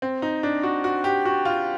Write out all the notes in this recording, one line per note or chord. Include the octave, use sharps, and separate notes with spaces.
C4
D#4
D4
F#4
F#4
G4
F#4
F4